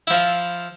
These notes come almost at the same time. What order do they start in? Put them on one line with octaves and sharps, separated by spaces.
E4 F3 F4